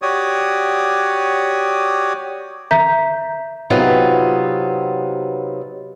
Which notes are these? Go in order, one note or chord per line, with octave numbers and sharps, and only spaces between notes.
F#4 G4 C#5 D5 D#6
E5 A#5 G6 B6
C3 F#3 B3 D#4 F4